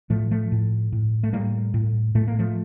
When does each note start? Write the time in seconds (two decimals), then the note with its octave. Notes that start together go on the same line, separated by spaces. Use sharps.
0.10 A2 F3 A3
0.31 F3 A3
0.52 A2
0.92 A2
1.23 A3
1.33 A2 G3 A#3
1.74 A2
2.15 A2 A3
2.28 A#3
2.39 F3 A3